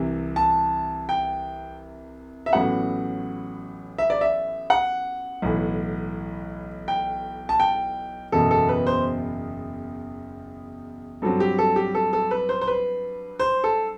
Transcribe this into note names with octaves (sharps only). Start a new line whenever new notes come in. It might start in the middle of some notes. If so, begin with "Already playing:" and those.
Already playing: C2 C3 E3
A5
G5
E5
A1 A2 F#3 B3 F#5
E5
D5
E5
F#5
B1 A2 E3
G5
A5
G5
F#1 E2 B2 A4
A4
B4
C5
G2 F#3 C4 A4
G4
A4
G4
A4
A4
B4
C5
C5
B4
C5
A4